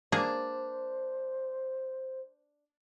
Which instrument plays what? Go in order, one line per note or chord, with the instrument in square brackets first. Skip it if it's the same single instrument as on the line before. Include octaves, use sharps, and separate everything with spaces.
[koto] A#3 G#4 [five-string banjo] D4 [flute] C5